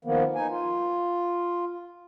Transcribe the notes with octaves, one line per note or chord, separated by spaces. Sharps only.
D#3 F3 A#3 B3
D#4 G#5
F4